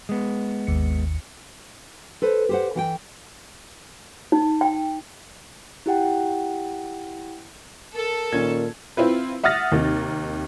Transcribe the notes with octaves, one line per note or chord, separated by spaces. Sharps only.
G#3 B3
G#1 D#2 C#7
A4 B4 C5
G4 C5 F#5
E3 F#5 G5
D#4
G5
E4 G4 F#5 G5
A4 A#4
A#2 D#3 C#4 G#6
C4 E4 F4 B4
E5 F#5 D#6 F6 A6 A#6
D#2 C3 D#3